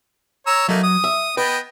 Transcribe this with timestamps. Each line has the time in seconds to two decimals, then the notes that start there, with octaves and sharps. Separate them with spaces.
0.47 C#5 A#5 E6
0.69 F#3 A3 A#3 D#4
0.84 D#6
1.04 E5
1.37 B3 B4 D#5 G5